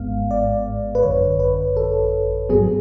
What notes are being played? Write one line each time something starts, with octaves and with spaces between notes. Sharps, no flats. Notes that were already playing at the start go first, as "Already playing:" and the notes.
Already playing: G#1 G#2 G#3 B3 F5
D5
B4
G#1 F#2 D3 C#5
B4
A4
G#2 F#3 B3 G#4